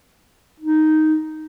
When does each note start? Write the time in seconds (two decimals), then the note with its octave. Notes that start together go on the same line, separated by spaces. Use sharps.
0.60 D#4